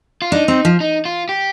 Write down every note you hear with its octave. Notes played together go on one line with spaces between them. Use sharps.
F4
D4 D#4
C4
F3
D#4
F4
G4